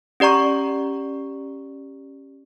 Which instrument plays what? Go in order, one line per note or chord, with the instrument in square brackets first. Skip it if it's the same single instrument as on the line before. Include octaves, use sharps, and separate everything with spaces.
[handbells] C#4 G4 D5 A#5 C#6